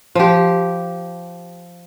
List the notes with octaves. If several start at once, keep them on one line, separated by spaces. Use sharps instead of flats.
F3 G4